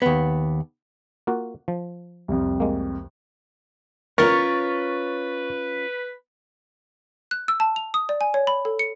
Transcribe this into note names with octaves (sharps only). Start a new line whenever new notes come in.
D#2 B3
A#3 F4 F#4
F3
C2 F2
G#3 A#3
C#4 F4 A#4 B4 C#5 C#6 A6
F#6
E6
A5
F7
D#6
D5
G#5
C#5
B5
A4
C#7